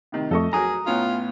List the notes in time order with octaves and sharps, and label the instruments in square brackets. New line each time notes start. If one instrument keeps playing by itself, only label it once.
[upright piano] A2 C3 D#3
[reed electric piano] F2 A3 [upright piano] A4 D#5 C#6
[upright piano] F#3 A#4 [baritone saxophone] G#4 [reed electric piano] A#5 D#6
[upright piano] A2 B3 C#4 [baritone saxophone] F4